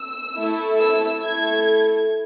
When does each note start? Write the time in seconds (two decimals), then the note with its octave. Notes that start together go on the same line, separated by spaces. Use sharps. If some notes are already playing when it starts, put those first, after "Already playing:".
Already playing: E6
0.36 A3 E4 A4
0.79 E6
1.23 A3 E4 A4 G#6